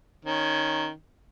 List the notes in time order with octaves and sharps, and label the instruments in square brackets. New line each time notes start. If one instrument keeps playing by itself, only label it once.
[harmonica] D#3 C#4